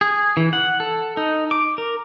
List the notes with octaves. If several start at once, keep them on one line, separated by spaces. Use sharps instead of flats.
G#4
E3
F#5
A4
D#4
D6
A#4